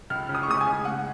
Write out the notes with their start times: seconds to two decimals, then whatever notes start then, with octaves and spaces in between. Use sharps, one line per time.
0.10 C#2 F6
0.29 C#3
0.35 D#6
0.43 C#6
0.48 G#3 D#6
0.61 G#5
0.67 C#3
0.85 G#3 F#5